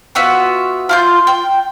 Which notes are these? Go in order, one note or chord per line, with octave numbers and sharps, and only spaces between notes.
B3 F4 F#4 E5
F4 C6 G6
G5